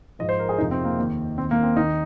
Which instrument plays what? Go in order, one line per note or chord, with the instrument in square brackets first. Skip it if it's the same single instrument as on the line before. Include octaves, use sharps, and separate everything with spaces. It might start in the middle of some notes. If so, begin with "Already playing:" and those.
[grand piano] G#2 F3 D#5
C5
A#4
G#4
F2 C3 F3 D#4
C4
A#3
D#2 D#3
D#2 D#3 C4
A#3
C4
D#2 D#3 D#4